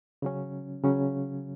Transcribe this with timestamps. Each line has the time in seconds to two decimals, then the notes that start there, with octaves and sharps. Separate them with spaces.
0.22 C#3 F#3 C#4
0.84 C#3 F#3 C#4